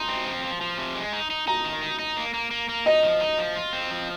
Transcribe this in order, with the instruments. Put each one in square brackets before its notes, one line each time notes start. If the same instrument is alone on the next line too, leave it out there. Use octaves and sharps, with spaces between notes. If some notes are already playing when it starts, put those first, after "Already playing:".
Already playing: [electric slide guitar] D#4 [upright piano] C6
[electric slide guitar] C4
F3
F3
F3
C3
G#3
D#4
D#4
[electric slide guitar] D#4 [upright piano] A#5
[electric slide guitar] D#3
D#4
D#4
A#3
A#3
A#3
A#3
[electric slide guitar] D#4 [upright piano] D#5
[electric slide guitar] F3
D#4
F3
F4
C4
F3